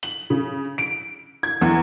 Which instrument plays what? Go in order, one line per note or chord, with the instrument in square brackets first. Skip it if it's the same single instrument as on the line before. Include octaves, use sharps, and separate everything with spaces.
[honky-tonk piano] F#7
C#3
D7
G#6
E2